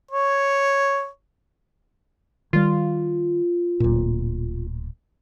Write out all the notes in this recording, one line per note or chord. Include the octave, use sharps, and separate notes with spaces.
C#5
D#3 G3 F4
D1 A#2